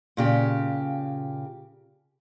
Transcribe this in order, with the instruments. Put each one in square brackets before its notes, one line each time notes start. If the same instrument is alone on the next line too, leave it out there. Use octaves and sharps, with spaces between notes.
[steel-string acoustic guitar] A#2 C#3 G4